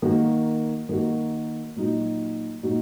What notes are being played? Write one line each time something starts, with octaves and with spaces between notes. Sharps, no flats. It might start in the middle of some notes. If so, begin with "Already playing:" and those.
D#3 A#3 F#4
D#3 A#3 F#4
A#2 F#3 D#4 F#4
A#2 F#3 D#4 F#4